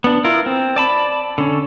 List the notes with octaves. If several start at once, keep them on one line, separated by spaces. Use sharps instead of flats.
B3 D4
E4 F4 A#4
C4
D5 A5 B5
D3 C#4